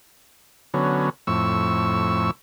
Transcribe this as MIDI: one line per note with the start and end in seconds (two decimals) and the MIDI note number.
0.74 1.09 50
0.74 1.09 54
0.74 1.09 59
0.74 1.09 61
1.27 2.31 41
1.27 2.31 45
1.27 2.31 85
1.27 2.31 88